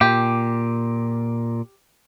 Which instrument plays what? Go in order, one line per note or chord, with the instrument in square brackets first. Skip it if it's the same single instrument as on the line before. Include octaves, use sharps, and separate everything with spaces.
[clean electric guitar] A#2 [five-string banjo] G4